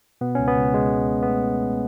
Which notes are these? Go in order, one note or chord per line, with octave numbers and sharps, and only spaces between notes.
B2 B3
C#2 C#4
B3
C#2
B2 G#3
C#2
B2
B3
C#2 A3
B2
C#2